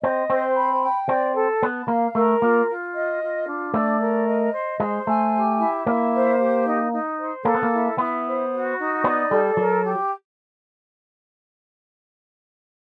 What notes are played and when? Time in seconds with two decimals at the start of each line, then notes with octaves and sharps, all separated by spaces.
0.03 C4 D#5
0.30 C4 C5
0.56 B5
0.82 G5
1.09 C4 D5
1.35 A4
1.62 B3 A5
1.88 A#3 F5
2.15 A3 A#4
2.41 A#3 F4
2.69 F4
2.95 D#5
3.21 F4
3.48 D4
3.74 A3 D5
4.00 A#4
4.27 D#5
4.53 C5
4.80 G#3 C5
5.07 A3 G#5
5.33 G4
5.60 E4
5.87 A#3 E4
6.13 C5
6.39 G4
6.66 D#4
6.92 D#4
7.19 C5
7.45 A#3 A4
7.55 B3
7.63 A#3
7.72 E4
7.98 B3 E4
8.25 C5
8.52 F#4
8.78 D#4
9.04 B3 D5
9.31 G3 A4
9.57 F#3 A#4
9.83 G4